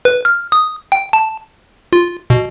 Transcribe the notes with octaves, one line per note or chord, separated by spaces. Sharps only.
B4
F6
D#6
G5
A5
F4
B2